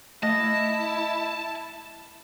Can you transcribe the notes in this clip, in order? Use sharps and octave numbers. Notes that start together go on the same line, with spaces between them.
A3 E4 D#5 A5 A#6